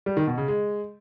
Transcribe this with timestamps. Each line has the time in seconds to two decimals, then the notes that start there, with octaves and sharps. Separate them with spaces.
0.06 G3
0.17 D#3
0.27 B2
0.38 C#3
0.48 G#3